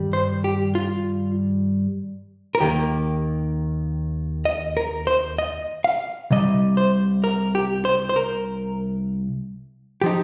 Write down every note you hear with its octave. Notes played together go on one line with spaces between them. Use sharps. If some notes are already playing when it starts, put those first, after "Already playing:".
Already playing: G2 D#3 G3
C5
G4
F4
A#4
D#2 D#3 A#3 G4
D#5
A#4
C5
D#5
F5
C2 C3 G3 D#5
C5
A#4
G4
C5
C5
A#4
F3 D#4 G4